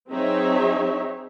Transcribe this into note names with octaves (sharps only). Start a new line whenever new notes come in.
F#3 C4 D#4 G#4 C#5 E5